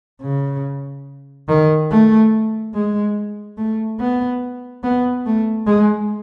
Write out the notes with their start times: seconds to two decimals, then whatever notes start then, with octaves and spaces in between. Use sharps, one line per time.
0.22 C#3
1.48 D#3
1.91 A3
2.74 G#3
3.57 A3
4.00 B3
4.83 B3
5.26 A3
5.67 G#3